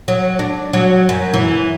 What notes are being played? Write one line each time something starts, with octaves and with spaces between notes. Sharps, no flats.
F#3
D4
F#3
F#2
E3